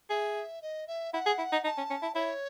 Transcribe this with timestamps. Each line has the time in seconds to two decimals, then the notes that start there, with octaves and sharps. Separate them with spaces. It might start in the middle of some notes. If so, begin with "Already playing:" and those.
0.10 G#4 E5
0.62 D#5
0.87 E5
1.13 E4 F#5
1.26 G#4
1.39 E4
1.52 D#4
1.64 D#4 A5
1.78 C#4
1.90 C#4
2.02 E4
2.15 E4 C#5